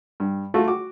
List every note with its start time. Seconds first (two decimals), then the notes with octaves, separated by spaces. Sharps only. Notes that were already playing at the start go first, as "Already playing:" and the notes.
0.20 G2
0.54 A3 F4 F#4
0.67 F#4 D6